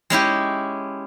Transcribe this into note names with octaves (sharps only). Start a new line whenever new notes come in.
G#3 C#4 E4 G4